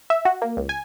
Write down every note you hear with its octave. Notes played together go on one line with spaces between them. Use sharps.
E5
F#4
A#3
C#2
G#5